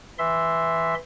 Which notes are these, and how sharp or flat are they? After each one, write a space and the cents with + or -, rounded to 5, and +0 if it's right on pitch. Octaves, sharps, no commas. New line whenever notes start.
E3 +0 E5 +0 C6 +0